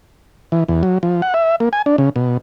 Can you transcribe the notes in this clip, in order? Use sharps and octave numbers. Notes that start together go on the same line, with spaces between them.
E3
E2
F#3
F3
F#5
E5
A#3
G#5
D4
C#3
B2